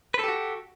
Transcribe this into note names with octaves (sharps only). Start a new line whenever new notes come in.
F#4 G4 A4 B4